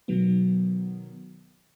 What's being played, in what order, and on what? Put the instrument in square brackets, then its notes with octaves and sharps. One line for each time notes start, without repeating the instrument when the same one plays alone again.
[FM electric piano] B2 D#3 F#3 B3